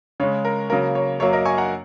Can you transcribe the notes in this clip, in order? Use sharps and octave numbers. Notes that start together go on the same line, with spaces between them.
C#3 G#3 C#5
A#4
C#3 F#3 A#3 A#4
C#5
F#2 F#3 A#3 C#5
A#4 D#5
G#5 C#6
F#5 A#5